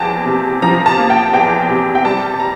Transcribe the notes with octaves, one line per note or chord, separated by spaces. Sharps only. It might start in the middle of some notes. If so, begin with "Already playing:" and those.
Already playing: E2 F3 A#3 G5 A5
C3
F3 A#5
A5
A#3
G5
E2 G5
C3
G5
G3 A5
A5
A#5